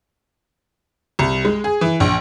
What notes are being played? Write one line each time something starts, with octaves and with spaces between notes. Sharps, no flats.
C2
G#3
G#4
E3
A#1